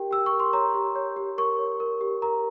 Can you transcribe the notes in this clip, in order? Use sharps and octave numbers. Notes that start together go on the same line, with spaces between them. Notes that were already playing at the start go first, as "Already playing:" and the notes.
Already playing: G4 A#4 G5
G4 E6
C#6
A#4
C6
C#5 A#5
G4
C#5
G4
A#4 C#6
C#5
A#4
G4
A#4 A#5